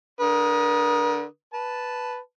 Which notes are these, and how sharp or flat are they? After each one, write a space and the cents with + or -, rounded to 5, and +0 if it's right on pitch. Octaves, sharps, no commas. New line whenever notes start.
D3 +0 A#4 +40 D#6 -5
B4 +0 A5 -5